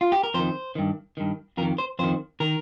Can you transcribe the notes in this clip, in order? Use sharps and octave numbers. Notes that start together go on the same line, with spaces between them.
F4
G4
A#4
F2 D#3 C5
G2 D#3
G2 D#3
F2 D#3 A#4
C5
F2 D#3 C5
D#3 A#4